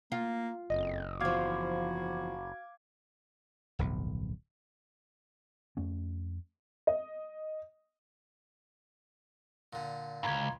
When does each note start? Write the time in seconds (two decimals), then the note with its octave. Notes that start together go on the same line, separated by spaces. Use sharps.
0.12 A#3 F4
0.70 F#1 F2 D#5
1.20 E2 F3 F#4 F5 D6 G#6
3.79 D1 B1 F2
5.77 F2 A3 C#4
6.87 D#5
9.73 A#2 D3
10.23 C#2 G2 F5 A#5 G#6